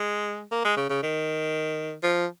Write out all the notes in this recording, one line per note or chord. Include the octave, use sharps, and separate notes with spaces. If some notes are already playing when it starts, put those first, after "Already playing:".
Already playing: G#3
A#3
G#3
C#3
C#3
D#3
F3